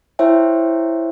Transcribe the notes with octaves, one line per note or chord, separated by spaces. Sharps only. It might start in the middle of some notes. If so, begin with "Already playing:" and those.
E4 C5 C#5 E5 G5